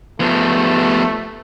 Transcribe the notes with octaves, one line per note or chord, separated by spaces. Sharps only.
F3 A3 B3